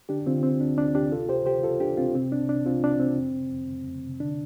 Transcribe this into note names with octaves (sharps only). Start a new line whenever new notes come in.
D3 D4 G4
D3 C4 F4
D3 C4
D2 D4
D2 D4
D2 D4 G4
C3 F4 A4
C3 G4 C5
C3 G4 C5
C3 F4 A4
C3 D4 G4
C2 C4 F4
C3 C4
C2 D4
C3 D4
C2 C4 F4
C2 D4
C3 C4
F2
C3
F2
F2
F2
C3
D3 D4